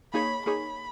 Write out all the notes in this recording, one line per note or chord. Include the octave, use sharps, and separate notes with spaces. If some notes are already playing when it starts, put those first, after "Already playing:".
A#3 D#4 G#4 C#5 B5
A#3 D#4 G#4 C#5 B5